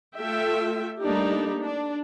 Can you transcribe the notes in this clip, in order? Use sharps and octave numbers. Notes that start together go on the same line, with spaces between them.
A3 F4 A4 E5 G5
G3 A3 A#3 D4 D#4 G4
D4